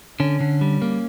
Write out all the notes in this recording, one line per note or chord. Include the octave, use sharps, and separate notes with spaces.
D3 C#4
D3
G3
A#3